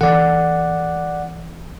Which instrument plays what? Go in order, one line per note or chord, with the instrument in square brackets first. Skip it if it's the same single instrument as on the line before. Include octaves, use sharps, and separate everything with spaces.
[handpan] E3 A4 [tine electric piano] D5 F#5